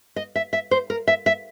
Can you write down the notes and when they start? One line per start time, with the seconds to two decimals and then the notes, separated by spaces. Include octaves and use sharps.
0.16 D#5
0.36 E5
0.53 E5
0.71 C5
0.90 A#4
1.08 E5
1.26 E5